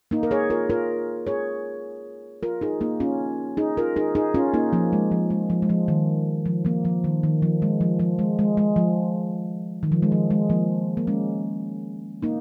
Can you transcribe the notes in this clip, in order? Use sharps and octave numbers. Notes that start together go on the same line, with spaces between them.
A#3 D#4
A#4
G#4 C#5
F4 A#4
F4 A#4
G#4 C#5
F4 A#4
D#4 G#4
A#3 D#4
C#4 F4
D#4 G#4
F4 A#4
D#4 G#4
D#4 G#4
C#4 F4
A#3 D#4
F3 A#3
G#3
F3
G#3
F3
G#3
F3
D#3
F3
F3 A#3
F3
D#3
D#3
F3
G#3
F3
F3
G#3
G#3
G#3
F3
D#3
F3
G#3
F3
G#3
F3 A#3
A#3
G#3 C#4
A#3 D#4